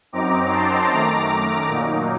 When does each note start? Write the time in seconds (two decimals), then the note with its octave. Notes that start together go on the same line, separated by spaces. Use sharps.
0.13 F#2 F#3 C4 D#4 A#5 D6
0.52 A5 C6
0.90 F#2 D#3 A3 A#5 D6
1.29 A#5 D6
1.69 A#2 F#3 A#3 D#4